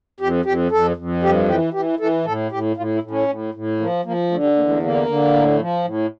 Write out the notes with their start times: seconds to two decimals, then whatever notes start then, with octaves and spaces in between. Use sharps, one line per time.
0.20 F2 G4
0.45 F2 G4
0.71 F2 A4
0.96 F2
1.23 G2 G4
1.48 E3 G4
1.74 E3 G4
1.99 E3 A4
2.25 A2 A4
2.51 A2 G4
2.76 A2 F4
2.94 E4
3.03 A2
3.11 C#4
3.28 A2
3.54 A2
3.80 F3 A#3
4.05 F3 A#3
4.31 D3 A3
4.43 G3
4.56 E2 A#3
4.69 A3
4.82 D3 A#3
5.07 D3
5.33 A2
5.59 F3
5.85 A2